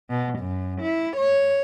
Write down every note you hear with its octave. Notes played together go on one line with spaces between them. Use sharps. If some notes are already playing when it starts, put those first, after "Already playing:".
B2
F#2
E4
C#5